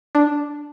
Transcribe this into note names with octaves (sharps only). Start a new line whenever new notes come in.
D4